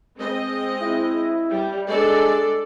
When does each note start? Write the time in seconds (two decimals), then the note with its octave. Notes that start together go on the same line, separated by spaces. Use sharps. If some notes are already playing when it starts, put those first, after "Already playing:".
0.17 G#3 C4 D#5
0.82 E4
1.51 G3
1.89 G#3 D4 A4 D5